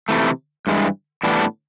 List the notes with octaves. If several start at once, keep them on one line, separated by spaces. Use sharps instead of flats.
C3 E3 A3
G2 E3 G#3
A2 E3 G3 B3 D4